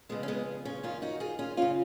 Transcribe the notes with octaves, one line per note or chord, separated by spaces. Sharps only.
F2 C#3 G#3 B3
C#4
G#3 B3
C#4 F4
F#2 D#3 C#4 F4
D#4 F#4
F4 G#4
C#4 F4
F#2 C#3 C#4 F4